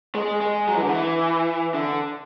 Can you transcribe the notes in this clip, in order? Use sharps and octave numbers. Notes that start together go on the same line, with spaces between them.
G#3
G#3
F#3
E3
D3
E3
D3